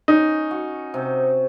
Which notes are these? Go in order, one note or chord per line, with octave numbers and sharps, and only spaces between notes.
C#4 D#4
F#4
C3